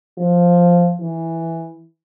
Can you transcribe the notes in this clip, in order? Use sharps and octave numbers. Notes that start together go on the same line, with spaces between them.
F3
E3